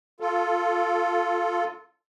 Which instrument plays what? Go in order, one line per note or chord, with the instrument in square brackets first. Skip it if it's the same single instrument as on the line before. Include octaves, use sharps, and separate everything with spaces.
[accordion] F4 A4